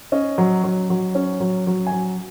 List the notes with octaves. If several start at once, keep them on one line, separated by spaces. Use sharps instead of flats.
C#4 D#5
F#3
F#3
F#3
C#4
F#3
F#3
G#5
F#3